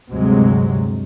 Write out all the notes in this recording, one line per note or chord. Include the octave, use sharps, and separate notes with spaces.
D2 G2 C3 F#3 G#3